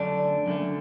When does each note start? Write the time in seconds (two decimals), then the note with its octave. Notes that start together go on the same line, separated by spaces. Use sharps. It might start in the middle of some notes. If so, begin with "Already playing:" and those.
Already playing: F#2 D3 A3 D4
0.46 F#2 D3 A3